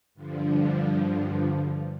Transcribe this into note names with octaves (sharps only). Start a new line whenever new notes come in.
G2 D3 F3